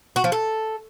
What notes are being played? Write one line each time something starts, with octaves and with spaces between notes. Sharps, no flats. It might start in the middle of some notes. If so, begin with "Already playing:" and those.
F#4
F3
A4